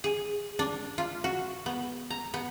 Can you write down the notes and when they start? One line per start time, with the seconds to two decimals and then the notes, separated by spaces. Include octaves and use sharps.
0.04 G#4
0.59 D4
0.98 F4
1.24 F#4
1.66 B3
2.10 A#5
2.34 B3